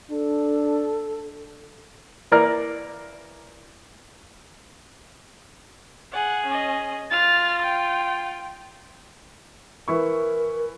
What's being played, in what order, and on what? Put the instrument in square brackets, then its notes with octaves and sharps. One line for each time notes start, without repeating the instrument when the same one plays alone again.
[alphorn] D4 [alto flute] A4
[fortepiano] E3 A#3 A#4 D5 A#5 F6
[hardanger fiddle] G#4 [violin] F#5
[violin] C#4 D#5
[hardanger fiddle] F4 [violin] F6 A6
[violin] G5
[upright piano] E3 E4 C#6 [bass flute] A#4